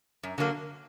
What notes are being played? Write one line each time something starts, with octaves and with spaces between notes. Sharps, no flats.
F#2
D3 F#3 A#3